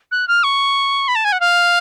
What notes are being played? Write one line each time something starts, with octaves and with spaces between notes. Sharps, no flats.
F#6
F6
C#6
B5
A5
G#5
F#5
F5